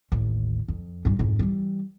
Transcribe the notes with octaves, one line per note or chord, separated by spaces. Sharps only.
A1 D#2
F2
G2 G3
F2 G#2
E3 G3